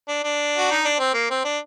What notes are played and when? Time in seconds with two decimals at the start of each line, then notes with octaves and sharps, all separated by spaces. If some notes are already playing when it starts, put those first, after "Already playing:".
0.08 D4
0.24 D4
0.58 F#4
0.71 D#4
0.85 D4
0.99 C4
1.14 A#3
1.30 C4
1.44 D4